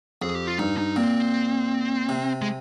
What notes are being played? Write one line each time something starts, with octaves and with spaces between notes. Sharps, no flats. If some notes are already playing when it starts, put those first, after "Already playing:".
F2 G#4
G4
F4
G2 D#4
D#4
A#2 C4
C3
G#3